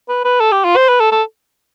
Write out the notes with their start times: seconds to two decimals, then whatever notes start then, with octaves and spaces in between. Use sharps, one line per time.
0.09 B4
0.25 B4
0.40 A4
0.52 G4
0.65 F4
0.76 C5
0.89 B4
1.00 A4
1.12 A4